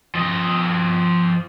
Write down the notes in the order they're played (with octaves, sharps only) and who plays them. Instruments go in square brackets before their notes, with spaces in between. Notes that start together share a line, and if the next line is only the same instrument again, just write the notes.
[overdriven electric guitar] F3 D#5